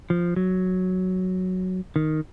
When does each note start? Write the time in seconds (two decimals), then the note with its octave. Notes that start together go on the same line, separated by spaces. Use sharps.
0.10 F3
0.36 F#3
1.96 D#3